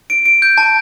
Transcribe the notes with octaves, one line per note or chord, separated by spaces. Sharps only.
D7
D7
G6
A5